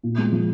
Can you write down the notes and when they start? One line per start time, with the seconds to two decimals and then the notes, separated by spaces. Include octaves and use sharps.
0.03 A#2
0.18 G#3
0.32 F3